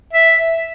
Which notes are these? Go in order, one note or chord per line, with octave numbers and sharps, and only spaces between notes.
E5